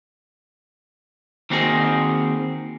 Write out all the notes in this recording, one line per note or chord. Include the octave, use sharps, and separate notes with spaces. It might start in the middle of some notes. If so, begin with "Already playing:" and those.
D#3 A#3 C4 D#4 F#4 G#4